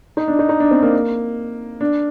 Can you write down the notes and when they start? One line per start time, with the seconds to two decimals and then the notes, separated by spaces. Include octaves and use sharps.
0.17 D#4
0.28 D4
0.39 D#4
0.49 D#4
0.60 D4
0.71 C4
0.82 A#3
1.81 D4